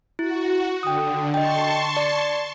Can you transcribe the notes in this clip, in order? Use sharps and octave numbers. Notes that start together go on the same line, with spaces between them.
E4 F#4
D3 G5 D#6
D#5 G5 A5 C6 C#6
D5